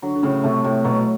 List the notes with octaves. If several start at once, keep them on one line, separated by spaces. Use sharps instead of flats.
D3 F#3
D3
A2 C#3
C3 A3
A2 C3
B2 F#3